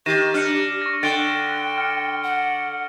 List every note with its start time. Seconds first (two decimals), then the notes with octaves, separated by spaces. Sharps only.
0.06 D#3 G4 A#6 D#7 E7
0.34 D4 F6 C#7
0.82 C#6 A#6
1.03 D3 G5 A6 D7 G7
1.78 F6 C#7
2.23 F#5